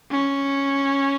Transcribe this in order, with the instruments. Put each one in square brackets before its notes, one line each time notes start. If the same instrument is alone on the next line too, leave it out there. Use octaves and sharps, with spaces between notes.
[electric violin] C#4